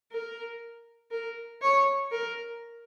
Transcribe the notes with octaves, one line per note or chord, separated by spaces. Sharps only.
A#4
A#4
C#5
A#4